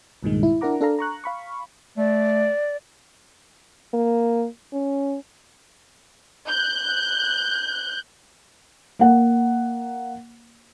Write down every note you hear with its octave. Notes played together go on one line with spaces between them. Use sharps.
C2 G2 A#2 D#3 G#3
E4
D4 E4 A#4 F#5 A#5 D6
D4 A4 F5 A#5
A#5 C#6 F#6
F5 B5 C#6
A3 D5
A#3
C#4
F#6 G6
A#3 F#5